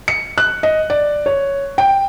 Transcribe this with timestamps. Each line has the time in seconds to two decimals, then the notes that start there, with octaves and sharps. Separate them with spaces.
0.08 C#7
0.38 F#6
0.63 D#5
0.90 D5
1.26 C#5
1.78 G5